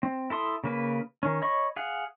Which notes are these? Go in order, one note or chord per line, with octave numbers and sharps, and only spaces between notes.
C4
E4 A4 C6 D#6
C#3 A#3 B4
D#3 C#4
C#5 D#5 B5 C#6
G#4 F5 F#5